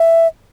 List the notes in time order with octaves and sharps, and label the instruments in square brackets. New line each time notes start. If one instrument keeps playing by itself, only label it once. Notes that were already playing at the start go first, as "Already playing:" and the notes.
Already playing: [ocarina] E5